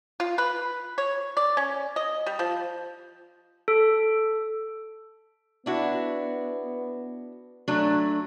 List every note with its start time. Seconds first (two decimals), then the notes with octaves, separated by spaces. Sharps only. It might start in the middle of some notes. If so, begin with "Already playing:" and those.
0.20 F4
0.38 B4
0.98 C#5
1.37 D5
1.57 C#4
1.96 D#5
2.26 G3
2.39 F3
3.68 A4
5.66 B3 D4 E4 F#4
7.68 F#3 A3 D4